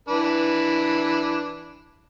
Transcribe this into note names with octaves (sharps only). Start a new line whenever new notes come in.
E3 D4 B4